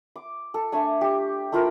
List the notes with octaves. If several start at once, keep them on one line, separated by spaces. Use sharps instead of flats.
D6
A4
A3 D4 G#5
G4
A3 E4 F4 A#4